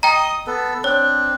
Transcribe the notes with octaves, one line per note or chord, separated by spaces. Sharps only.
D#5 G5 A#5 D#6
B3 A4
C4 D4 C#5